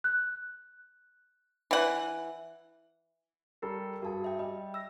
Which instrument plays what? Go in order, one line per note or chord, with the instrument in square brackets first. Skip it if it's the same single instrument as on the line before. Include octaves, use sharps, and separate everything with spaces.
[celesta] F#6
[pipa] E3 F#5
[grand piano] G3 A4 A#4 [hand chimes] G4
[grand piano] G2 G#4 [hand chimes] F#4 A5
[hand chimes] E5 G5
[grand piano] G3 [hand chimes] D#5
[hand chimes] E6 A#6